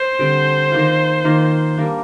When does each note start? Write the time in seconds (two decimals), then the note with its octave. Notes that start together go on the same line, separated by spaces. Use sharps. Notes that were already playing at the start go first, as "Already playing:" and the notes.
Already playing: C5
0.19 D3 G3 C4
0.72 D#3 A#3 F4
1.24 D#3 A#3 F4
1.77 G3 A#3 D4